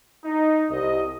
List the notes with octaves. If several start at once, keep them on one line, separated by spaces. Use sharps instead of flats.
D#4
C2 D#5